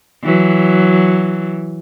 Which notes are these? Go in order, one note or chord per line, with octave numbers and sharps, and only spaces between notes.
E3 F#3